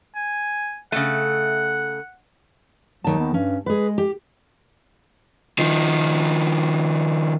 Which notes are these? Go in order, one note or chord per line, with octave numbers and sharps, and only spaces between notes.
G#5
C#3 A3 F#5
D#2 D#3 F#3 A5
B3
G2 C#4
G#3 G#4 B4
G4
D#3 F3